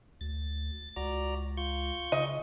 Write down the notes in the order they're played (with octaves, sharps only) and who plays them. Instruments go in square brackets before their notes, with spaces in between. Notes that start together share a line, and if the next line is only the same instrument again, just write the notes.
[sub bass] D2 [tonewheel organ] A6
[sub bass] C#2 [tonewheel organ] F#4 D5 A#5
[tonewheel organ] F4 C#6 G6
[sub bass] C#3 [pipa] D#5